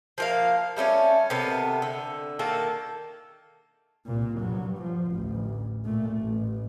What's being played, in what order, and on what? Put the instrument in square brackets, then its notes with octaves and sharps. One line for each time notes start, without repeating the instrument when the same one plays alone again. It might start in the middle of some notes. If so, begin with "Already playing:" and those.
[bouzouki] F3 A#3 F5
G3 A3 C4 C#4
C3 D#3 B3 A4
D3
D#3 A#3 A4
[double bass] C2 A#2
G2 F#3
F3
A1 D2
A#2 A3
A1